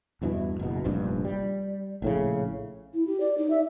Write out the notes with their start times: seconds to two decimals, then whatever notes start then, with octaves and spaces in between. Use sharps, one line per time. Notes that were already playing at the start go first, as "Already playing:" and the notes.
0.22 E2 G2 B2 E3
0.59 F#1 B2
0.84 F1 A#1 G2
1.25 G3
2.02 A#1 A2 C#3
2.94 E4
3.07 G4
3.20 D5
3.38 D#4
3.50 E5